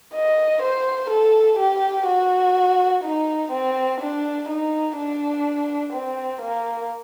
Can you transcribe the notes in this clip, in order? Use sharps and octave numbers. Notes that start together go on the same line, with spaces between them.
D#5
C5
A4
G4
F#4
D#4
C4
D4
D#4
D4
C4
A#3